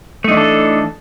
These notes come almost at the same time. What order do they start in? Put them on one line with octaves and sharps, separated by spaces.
A3 D#4 D4 E3 A4